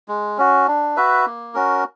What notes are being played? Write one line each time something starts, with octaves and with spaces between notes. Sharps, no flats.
G#3
C#4 F#4
D4
F#4 B4 E5
A#3
C#4 F#4 A#4